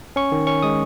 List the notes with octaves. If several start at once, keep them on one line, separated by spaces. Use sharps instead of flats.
C#4 C#6
D#3
C#4 C#6
G#3 D#6